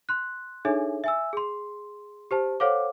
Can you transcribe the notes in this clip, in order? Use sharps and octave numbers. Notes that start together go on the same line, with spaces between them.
C6 F#6
D4 D#4 G#4 A4 C#5 E5
E5 G#5 E6
G#4 C6
G4 C5 A5
A4 C5 C#5 F5 F#5 D6